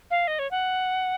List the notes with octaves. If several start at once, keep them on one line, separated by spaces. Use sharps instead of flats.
F5
D#5
C#5
F#5